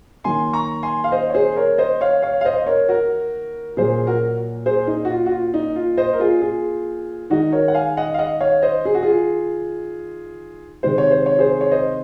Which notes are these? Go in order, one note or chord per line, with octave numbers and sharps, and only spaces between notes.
D#3 F#3 A#3 G#5 C6
A#5 C#6
G#5 C6
F5
C5 D#5
C#5
G#4 C5
A#4 C#5
C5 D#5
C#5 F5
C#5 F5
F5
C5 D#5
D#5
A#4 C#5
F#4 A#4
A#2 F#3 A#3 G#4 C5
F#4 A#4
G#4 C5
D#4
F#4
F4
F#4
F4
D#4
F4
C5 D#5
A#4
F4 G#4
F4 G#4
D#3 G#3 D#4 F#4
A#4 C#5
F#5
F5 G#5
D#5 F#5
F5
D#5 F#5
C#5 F5
C5 D#5
G#4
F#4
F4 G#4
C3 D#3 G#3 C5
C#5
C5
C#5
G#4 C5
C#5
C5 D#5